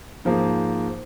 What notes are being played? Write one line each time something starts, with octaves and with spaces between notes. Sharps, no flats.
G#2 F3 A#3